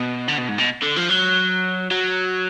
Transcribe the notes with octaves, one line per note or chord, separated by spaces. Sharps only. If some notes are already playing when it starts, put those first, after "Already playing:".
Already playing: B2
D3
B2
G#2
B2
D3
F3
F#3
F#3